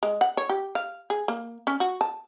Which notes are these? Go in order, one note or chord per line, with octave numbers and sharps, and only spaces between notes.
G#3
F#5
C#5
G4
F5
G#4
A#3
C#4
F#4
A5